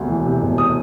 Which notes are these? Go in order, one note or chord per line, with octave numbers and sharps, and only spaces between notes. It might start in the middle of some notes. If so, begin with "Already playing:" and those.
Already playing: E1 D2 C3
E3
C3
E1
D#6